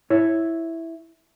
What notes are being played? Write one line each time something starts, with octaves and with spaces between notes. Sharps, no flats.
E4 C#5